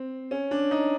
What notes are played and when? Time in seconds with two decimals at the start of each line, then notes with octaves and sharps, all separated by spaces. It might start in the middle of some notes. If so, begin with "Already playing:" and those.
Already playing: C4
0.31 C#4
0.51 D4
0.71 D#4